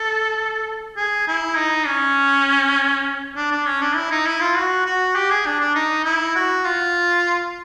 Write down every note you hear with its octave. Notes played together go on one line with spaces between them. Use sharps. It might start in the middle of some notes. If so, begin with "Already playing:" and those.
Already playing: A4
G#4
E4
D#4
C#4
D4
D4
C#4
D4
E4
D#4
E4
F4
F#4
F#4
G4
G#4
D4
D4
D#4
E4
F#4
F4